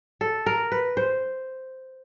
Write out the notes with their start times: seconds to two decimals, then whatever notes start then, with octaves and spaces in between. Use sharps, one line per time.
0.21 A4
0.46 A#4
0.72 B4
0.97 C5